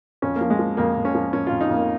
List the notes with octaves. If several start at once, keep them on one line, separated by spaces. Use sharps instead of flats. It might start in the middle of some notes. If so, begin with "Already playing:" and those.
F2 C#4
A#3
F3
G#3
F3
F2 A#3
F2
C#4
F3
F3 C#4
F2 F4
D#4
F2 A#3